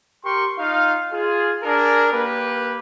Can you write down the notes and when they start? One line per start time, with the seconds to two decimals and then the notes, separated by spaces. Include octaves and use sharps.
0.23 G4 A#4 C6 C#6
0.58 D#4 F4 F5
1.12 F4 G#4
1.63 D4 G#4 A#4
2.13 A#3 G4 B4